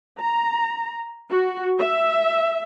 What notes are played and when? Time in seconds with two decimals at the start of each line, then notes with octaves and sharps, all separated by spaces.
0.19 A#5
1.30 F#4
1.79 E5